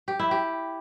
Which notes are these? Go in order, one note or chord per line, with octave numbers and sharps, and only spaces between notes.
G4
E4
G4